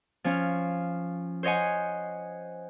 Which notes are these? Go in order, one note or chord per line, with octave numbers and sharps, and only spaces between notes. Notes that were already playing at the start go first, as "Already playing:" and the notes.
F3 C#4
C5 C#5 D#5 F#5 G#5